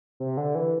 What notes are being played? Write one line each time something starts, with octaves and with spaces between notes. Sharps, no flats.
C3
D3
E3